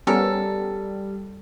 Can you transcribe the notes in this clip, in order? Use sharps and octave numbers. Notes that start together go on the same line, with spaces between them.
G3 B3 C#4 A4 A#4